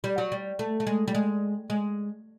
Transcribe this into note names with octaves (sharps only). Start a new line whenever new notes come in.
G3
F#3
G3
A3
A3
G#3
G3
G#3
G#3